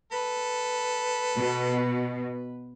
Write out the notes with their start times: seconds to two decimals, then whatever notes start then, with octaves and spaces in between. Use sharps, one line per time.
0.12 A4 B4
1.37 B2